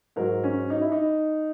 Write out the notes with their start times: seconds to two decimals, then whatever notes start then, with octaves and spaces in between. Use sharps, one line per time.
0.16 G#2 F#3 A#4
0.44 C#4
0.70 D#4
0.81 E4
0.92 D#4